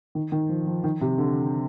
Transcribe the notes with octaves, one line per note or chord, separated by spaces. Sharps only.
D#3
D#3
F3
F3
D#3
C3
D3